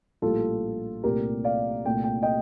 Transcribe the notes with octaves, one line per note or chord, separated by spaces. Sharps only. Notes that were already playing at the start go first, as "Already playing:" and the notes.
A#1 A2 G3 A#3 F4 A4
C2 A#2 A3 G4 A#4
D5 F5
C2 A#2 A3 G5
G5
D#5 G5